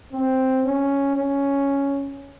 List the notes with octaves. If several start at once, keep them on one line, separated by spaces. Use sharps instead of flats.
C4
C#4
C#4